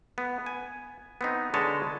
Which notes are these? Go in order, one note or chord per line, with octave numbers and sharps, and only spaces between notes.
B3
G#5
B3 C4 D#4
D3 G#3 B4 C#5 D#5 A5